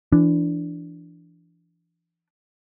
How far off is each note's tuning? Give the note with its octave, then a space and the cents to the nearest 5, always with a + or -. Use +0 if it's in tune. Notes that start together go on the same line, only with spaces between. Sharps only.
E3 +30 D4 -5